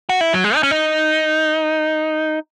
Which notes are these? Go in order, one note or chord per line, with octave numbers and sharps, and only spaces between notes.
F#4
E4
F#3
G#3
D#4
C#4
D#4